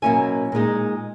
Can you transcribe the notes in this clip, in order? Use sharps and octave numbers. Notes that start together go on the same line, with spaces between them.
B2 F#3 A#3 C#4 E4 G#5
A#2 G#3 D#4